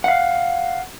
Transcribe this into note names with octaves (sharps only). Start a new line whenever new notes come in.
F5 F#5